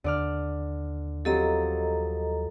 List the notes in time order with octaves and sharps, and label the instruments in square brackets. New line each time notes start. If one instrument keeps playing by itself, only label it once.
[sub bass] D#2 [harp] D3 D5 F6
[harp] F3 F#3 C4 [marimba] G4 [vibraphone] A4 D#5 A#5